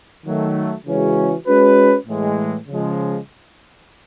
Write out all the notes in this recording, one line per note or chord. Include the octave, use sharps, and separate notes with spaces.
D#3 F#3 A3
C#3 E3 G#3 C#4 F#4
G#3 C#4 F#4 B4
A2 E3 G#3
C#3 F3 G#3